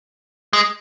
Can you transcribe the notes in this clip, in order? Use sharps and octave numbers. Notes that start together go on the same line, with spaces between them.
G#3